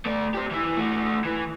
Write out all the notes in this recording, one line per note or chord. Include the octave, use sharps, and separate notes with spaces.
A3 D5
G4 C5
E3 E4
A3 F#4
E3